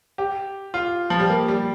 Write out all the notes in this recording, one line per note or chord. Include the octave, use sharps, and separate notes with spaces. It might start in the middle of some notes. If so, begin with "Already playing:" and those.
G4
F4
F3
G3
A#3
G3